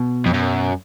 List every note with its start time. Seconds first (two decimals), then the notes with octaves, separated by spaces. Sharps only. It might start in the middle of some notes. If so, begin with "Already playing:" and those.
Already playing: B2
0.26 F2
0.34 F#2